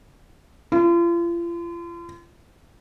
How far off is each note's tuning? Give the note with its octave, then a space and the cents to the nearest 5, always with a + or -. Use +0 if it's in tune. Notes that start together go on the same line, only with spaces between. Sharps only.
F4 -40